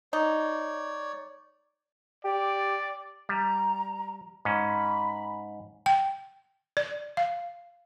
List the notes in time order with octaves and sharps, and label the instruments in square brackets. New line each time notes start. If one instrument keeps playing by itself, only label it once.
[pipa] D#4 [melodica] C#5 D5
[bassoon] G4 [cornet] D5
[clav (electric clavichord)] G3 [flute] A#5
[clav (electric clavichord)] G#2 C#4 [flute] B5
[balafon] G5
D5
F5